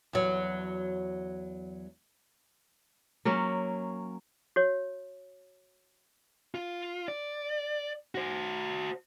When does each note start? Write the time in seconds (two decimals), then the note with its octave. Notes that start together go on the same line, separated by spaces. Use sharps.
0.13 E2 F#3
3.25 F#3 A#3 C#4
4.56 F#4 C#5
6.55 F4
7.08 D5
8.15 F#4 C5